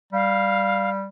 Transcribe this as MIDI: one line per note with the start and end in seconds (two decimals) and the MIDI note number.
0.13 1.08 55
0.13 0.89 77